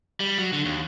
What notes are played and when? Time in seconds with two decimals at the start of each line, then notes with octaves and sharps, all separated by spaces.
0.20 G3
0.38 F#3
0.53 D3
0.65 D#2